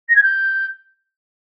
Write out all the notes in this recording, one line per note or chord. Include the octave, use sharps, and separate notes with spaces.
A#6
G#6
G6